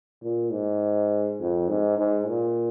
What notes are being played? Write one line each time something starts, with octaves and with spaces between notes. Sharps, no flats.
A#2
G#2
F2
G#2
G#2
A#2